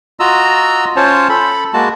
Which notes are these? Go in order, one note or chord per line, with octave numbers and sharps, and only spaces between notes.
F4 F#4 D#5 A#5 E6
C#4 F4 C5 C#5 A5
A4 B5
G#3 A#3 F#4 A5